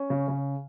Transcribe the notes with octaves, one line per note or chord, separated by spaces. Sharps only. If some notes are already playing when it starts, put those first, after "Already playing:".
Already playing: C#4
C#3
C#3